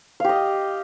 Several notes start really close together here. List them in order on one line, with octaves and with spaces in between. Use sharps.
F5 G4 D#5